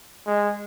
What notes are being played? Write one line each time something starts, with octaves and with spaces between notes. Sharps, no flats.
G#3